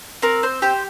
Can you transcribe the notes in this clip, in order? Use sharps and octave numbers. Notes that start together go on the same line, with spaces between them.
C4 A#4
C5
G4 C5